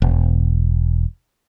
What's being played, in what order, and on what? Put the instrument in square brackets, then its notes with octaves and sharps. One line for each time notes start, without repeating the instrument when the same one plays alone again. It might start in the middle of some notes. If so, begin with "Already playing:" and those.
[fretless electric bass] E1